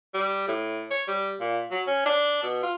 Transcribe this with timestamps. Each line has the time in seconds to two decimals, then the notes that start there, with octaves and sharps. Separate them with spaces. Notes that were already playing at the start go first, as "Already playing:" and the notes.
0.14 G3
0.48 A2
0.91 C#5
1.08 G3
1.40 A#2
1.71 F#3
1.87 C#4
2.06 D4
2.43 B2
2.63 F4